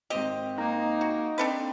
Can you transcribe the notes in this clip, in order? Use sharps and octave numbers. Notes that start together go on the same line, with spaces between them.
G#1 C4 G4 D#5 G5
A#3 D#4
F#4
C4 D4 A4 B4